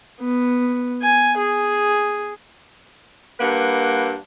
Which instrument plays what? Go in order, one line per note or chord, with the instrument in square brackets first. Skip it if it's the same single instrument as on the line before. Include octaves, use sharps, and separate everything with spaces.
[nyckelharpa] B3
G#5
G#4
[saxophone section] G2 A#3 B4 F#5